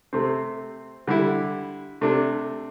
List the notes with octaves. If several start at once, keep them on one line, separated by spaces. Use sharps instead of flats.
C3 A3 C4
D3 G3 E4
C3 A3 D4